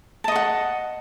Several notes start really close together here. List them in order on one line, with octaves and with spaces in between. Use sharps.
A5 D#5 C#6 F#5